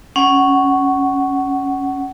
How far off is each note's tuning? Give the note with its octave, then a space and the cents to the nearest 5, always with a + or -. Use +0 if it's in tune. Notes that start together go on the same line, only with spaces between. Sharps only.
C#4 +0 F#5 +20